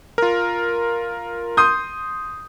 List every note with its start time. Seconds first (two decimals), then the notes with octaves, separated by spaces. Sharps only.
0.18 F4 A#4
1.57 C6 D#6 G6